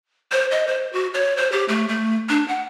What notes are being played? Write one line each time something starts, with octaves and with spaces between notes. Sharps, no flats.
C5
D#5
C5
F#4
C#5
C5
G4
A3
A3
D4
F#5